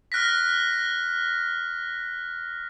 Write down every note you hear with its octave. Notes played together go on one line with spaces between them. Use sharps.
F6 F#6 A#6 B6